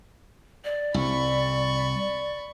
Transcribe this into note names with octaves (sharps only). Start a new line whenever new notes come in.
D5
C2 B5 C#6